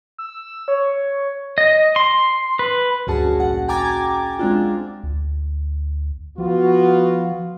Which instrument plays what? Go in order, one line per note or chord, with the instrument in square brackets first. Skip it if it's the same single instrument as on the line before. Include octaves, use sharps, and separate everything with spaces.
[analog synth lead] E6
C#5
[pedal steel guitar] D#5
C6
B4
[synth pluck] D2 G2 C#4 F#4 G#4 A5
A#1 F#5
G5 G#5 A#5 D6 G#6 A6
G#3 C4 D4 F4
[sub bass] D2
[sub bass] F3 [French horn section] B3 F4 F#4